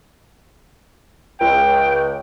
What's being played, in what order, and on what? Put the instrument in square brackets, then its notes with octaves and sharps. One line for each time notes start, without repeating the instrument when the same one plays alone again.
[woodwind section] C#2 [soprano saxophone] G5